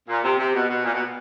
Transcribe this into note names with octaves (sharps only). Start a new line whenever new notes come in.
A#2
C3
C3
B2
B2
A#2
B2